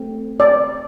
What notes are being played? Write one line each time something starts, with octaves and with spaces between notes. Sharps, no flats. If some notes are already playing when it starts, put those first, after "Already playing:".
Already playing: A3 C4
D5